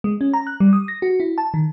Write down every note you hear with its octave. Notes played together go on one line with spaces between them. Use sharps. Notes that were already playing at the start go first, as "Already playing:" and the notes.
G#3
C#4
A#5
F#6
G3
D#6
A#6
F#4
E4
A5
D#3